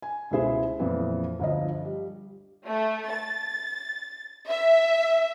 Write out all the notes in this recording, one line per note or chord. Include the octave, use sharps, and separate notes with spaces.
G#5
C#2 B2 G#3 E4 G#4 C5
F2 A#2 E3 F3 B3
G1 D2 F3 D#5
G3
A3
A6
E5